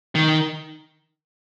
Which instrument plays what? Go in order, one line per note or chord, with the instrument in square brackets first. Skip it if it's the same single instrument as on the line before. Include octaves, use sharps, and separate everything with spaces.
[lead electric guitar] D#3